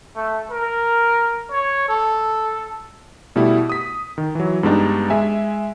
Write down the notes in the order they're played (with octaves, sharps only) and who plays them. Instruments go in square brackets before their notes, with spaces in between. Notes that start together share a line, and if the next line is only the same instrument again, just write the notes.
[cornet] A3
A#4
C#5
A4
[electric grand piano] B2 G3 A3 E4
D#6 B6
D#3
E3 F#3
G2 G3 G#3 B3 D4 D#4
G#3 E5 G#5